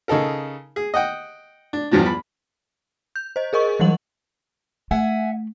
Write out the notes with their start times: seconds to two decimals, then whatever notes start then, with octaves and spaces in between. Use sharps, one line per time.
0.08 C#3 D#4 A4 A#4
0.76 G#4
0.94 D#5 F#5 G5
1.73 D4
1.91 E2 G2 F3 F#3 D4
2.06 B5
3.16 G6
3.36 C5 D#5
3.53 G#4 A#4 D#5 C#6
3.80 E3 F#3 G3 F#5 F#7
4.91 A3 E5 F#5 G#5